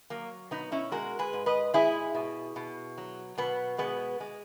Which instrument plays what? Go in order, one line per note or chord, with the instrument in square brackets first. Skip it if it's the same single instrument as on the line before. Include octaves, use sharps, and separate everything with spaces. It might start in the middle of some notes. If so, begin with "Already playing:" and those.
[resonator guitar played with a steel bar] F#3 A#3
B2 B3 D#4
C#4 E4
G#3 F#4 A#4
G#4 B4
G#2
B4 D#5
G#3 E4 G#4
B2
B2
F#3
B2 B3
G#3 B3
G#3